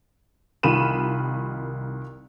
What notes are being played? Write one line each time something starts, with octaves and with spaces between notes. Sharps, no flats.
C2 D#3 F4 B5 D#7 E7